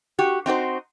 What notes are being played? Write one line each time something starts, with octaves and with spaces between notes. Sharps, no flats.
F#4 G4
C4 D#4 F#4 C5